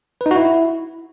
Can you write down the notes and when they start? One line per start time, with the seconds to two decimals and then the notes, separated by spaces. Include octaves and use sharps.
0.21 B4
0.26 D#4
0.31 F#4
0.36 E4